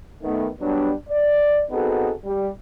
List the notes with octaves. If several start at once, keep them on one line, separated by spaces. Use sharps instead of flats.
D#3 A3 B3
F#3 G3 B3 D4
D5
B3 C4 D#4 F#4 G#4 A4
G3